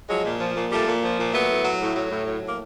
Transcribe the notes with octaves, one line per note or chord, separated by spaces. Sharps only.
F3 F#3 G#3
A#2
F3
A#2
F3 G3 A3
A#2
F3
A#2
F#3 A3 B3
A2
F#3
A2
F#3
A2
F#3
A2
A#3